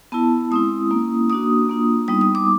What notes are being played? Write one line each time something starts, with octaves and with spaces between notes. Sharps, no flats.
B3 E4 A5
G#3 C4 E4 D#6
A#3 C#4 E4
A#3 D4 F#4 D#6
A#3 D4 F4
G3 B3 D#4 D#6
D#6
D6